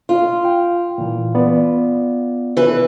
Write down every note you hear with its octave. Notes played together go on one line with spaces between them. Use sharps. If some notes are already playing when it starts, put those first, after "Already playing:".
F4
G5
A#2 E3
B3 D5
E3 B4